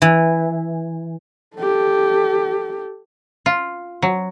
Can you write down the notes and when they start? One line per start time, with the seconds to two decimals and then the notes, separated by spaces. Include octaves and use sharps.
0.02 E3
1.57 G4 A4
3.46 F4
4.02 F#3